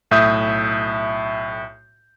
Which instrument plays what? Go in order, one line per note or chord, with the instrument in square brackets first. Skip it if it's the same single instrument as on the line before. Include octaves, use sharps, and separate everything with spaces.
[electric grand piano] B1 A2 E5 D#6 G6